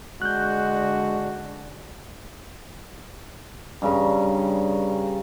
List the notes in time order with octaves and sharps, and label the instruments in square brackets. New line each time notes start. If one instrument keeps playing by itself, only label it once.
[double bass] D3 D4 [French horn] G#3 [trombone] F#4 [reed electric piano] F#6 G6
[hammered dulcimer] G2 C#3 A#5